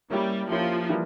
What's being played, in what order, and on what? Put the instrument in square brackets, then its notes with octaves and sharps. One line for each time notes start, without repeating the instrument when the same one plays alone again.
[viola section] G3 [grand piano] A#3 C#4 E4 G4
[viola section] F3 [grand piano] A#3 C#4 E4 G4
[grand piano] E3 G3 A#3